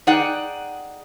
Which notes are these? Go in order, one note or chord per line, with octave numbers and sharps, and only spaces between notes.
D#4 G#4 D5 F#5 G5